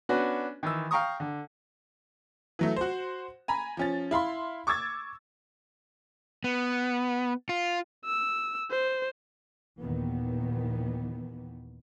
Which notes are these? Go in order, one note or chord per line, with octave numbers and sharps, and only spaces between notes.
B3 C#4 D4 F#4 B4
D#3 E3 E6
F5 G5 A#5 C#6 D#6
D3
E3 F#3 A3
F#4 C5
G#5 A#5 B5
F3 C#4 A6
E4 F5 B5 C6
C#6 D6 E6 G#6 A6
B3
F4
E6
C5
D#2 A#2 D#3 E3 B3